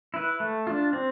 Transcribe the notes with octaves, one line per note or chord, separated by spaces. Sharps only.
E4 B4
A3
D4 F4
C4